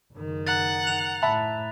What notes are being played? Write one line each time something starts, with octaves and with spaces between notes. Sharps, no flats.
F#1 D#3
F#5 A#5 F#6 A6
F7
A2 E5 A5 B5